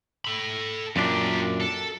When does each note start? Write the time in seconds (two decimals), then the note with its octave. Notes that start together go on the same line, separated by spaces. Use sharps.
0.25 A4 B5
0.96 F#2 A#2 D4 F4 G4
1.61 A4